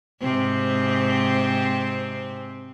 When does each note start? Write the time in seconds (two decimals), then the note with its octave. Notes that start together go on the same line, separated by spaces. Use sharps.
0.21 G#2 C3 C4